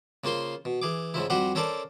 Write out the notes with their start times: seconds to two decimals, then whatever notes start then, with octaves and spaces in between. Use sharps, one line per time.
0.24 C#3 A#3 F4 C5 C6
0.65 B2
0.82 E3 G#4 D6
1.14 G#2 C#3 F3 E4
1.30 F2 G3 F#4 G4 C5 F#5
1.55 C#4 A4 A#4 C5 D5 A5